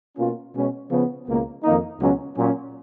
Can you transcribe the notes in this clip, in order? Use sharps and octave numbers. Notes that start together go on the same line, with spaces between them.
B2 A#3 C#4 F4
B2 G#3 C#4
C#3 F3 B3
C#2 B2 A#3
F2 D#3 A#3 D#4
C#2 B2 F#3 C#4 F#4
A#2 F#3 C#4